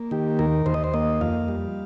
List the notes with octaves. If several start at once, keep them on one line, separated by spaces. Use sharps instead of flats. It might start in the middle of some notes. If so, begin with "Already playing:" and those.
Already playing: A#3
D#3 G4
D#2 A#4
D#2 C5
D#5
C5
A#3 D#5
F2 F5
G3